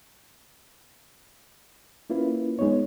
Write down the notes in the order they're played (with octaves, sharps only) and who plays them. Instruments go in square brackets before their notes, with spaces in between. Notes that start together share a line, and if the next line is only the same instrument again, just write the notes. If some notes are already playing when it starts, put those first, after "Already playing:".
[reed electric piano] A#3 C#4 E4 F4 B4
G#3 B3 D#4 C#5